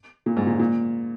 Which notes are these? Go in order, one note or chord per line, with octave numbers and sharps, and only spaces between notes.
A#2
G#2
A#2
A#2